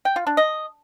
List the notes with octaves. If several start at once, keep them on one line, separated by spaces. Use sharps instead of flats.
G5
F4
D4
D#5